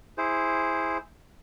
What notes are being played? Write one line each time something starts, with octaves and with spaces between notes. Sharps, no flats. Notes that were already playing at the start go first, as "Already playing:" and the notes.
E4 G#4 C5